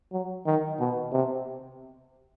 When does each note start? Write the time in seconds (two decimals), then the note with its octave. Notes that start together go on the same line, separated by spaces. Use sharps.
0.12 F#3
0.46 D#3
0.80 B2
1.13 C3